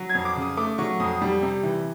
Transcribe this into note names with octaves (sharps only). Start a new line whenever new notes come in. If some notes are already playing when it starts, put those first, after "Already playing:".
Already playing: F#3
G#6
F2
D6
C#3
D#6
A3 D6
F#3 C#6
F2 D#6
G3
C3
E3